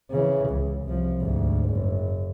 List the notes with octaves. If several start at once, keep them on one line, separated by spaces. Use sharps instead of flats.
C#3 E3
C#2
C2 F3
D2 G#2
F#1